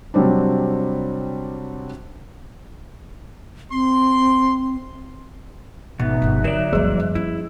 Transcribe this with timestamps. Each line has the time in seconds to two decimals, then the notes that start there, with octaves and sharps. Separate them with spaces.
0.14 C3 F#3 G3 C4 D4
3.71 C4 C6
5.99 G#1 B2 B3 D#4 E5 F#6
6.22 G1 F3
6.44 D3 F#3 C4 D5 E7
6.73 F#1 C#2 F3 G3 G#4
7.00 F#2
7.15 C#4 E4